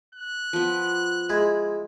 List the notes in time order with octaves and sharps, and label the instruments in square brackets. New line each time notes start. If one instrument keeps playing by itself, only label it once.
[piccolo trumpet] F#6
[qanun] F3 B3
[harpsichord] G#3 E4 F4